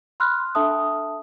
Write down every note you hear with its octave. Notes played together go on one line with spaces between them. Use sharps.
B5 C6 F6 F#6
D4 A4 E5 A5 D#6